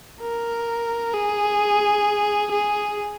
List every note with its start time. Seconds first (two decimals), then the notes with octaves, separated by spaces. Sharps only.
0.22 A#4
1.14 G#4
2.52 G#4